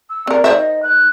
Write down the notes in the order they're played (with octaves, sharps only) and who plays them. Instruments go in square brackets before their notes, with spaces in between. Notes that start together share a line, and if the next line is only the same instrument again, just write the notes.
[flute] E6
[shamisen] C4 A#4 [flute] D5
[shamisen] D#3 C5 E5 [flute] D5
[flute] D#5
F#6